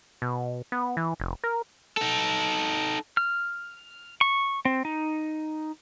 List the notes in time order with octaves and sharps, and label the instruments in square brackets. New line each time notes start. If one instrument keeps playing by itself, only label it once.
[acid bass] B2
B3
E3
F1
A#4
[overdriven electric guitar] D#4 A4
[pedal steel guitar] F6
C#6
C4
D#4